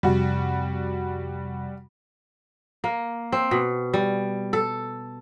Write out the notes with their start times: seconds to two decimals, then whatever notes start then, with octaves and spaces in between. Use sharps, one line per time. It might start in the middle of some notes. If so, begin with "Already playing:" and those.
0.03 F2 C3 G3 F#4
2.84 A#3
3.32 C4
3.51 B2
3.94 G3
4.53 A4